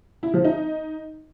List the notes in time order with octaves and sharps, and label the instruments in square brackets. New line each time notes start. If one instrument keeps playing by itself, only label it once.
[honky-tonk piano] E4
F3
D#4